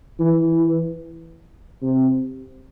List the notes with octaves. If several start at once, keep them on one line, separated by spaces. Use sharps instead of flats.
E3
C3